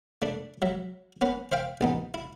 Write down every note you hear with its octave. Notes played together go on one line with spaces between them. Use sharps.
A3 D4
F#3 E5
B3 C#4 B4
C5 E5 F5 G5
A1 B3 D#4
E4